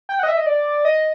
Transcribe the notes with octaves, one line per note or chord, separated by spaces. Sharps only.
G5
F#5
D#5
E5
D#5
D5
D#5